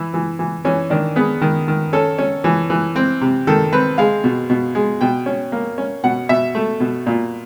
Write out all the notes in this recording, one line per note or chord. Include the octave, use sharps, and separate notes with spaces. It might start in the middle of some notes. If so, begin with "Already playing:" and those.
Already playing: E3 E4
E3
E3
E3 C#4
D#3 D4
B3 G#4
D#3
D#3
C#4 A4
C#4
E3
E3
C4
C3
D#3 A4
C4 B4
G#3 F5
B2
B2
G#3
B2 G5
C#4
A#3
C#4
B2 F#5
B2 E5
A3
B2
A#2